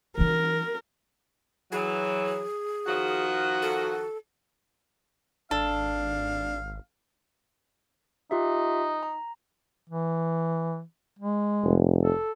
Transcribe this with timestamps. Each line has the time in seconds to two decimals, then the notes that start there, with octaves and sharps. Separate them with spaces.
0.18 E3 D#4 A#4
1.72 E3 F#3 G#4
2.87 D#3 F3 F#4
3.62 A4
5.51 G#1 D4 A4 F5
8.31 D#4 F4 G4 E5
9.03 A#5
9.90 E3
11.19 G#3
11.64 F1
12.03 A4